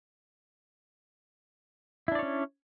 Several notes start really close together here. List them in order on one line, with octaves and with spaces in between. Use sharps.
E4 D4 D5 C#5 C#4